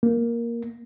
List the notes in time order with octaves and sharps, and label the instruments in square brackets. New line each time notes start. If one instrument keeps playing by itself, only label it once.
[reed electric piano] A#3